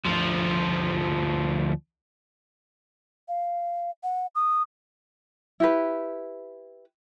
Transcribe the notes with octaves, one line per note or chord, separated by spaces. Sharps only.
D2 F3
F5
F#5
D#6
E4 G4 B4